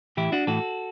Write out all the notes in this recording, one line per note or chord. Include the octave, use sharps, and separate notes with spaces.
A2 E3 E4 G4
D4 F#4
A2 E3 F#4 A4